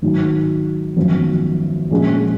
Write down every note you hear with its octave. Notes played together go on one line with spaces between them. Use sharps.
G#1 G#2 D#3 F#3
G#1 F#2 F3 B3
A#1 A#2 G#3 C#4 G#4